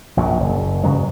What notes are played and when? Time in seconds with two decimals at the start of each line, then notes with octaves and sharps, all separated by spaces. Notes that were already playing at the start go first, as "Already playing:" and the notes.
0.17 A#1 F#2 A#2
0.40 F#1
0.84 G2 C#3 F#3 G#3